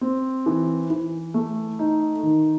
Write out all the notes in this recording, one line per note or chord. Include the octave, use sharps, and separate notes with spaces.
C4
E3
E3
A3
D#4
D#3